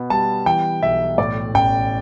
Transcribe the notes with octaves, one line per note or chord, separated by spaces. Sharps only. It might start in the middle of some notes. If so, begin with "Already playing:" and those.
Already playing: B2 B3
G3 A5
E3 G5
B1 E5
A2 D5
A1 G5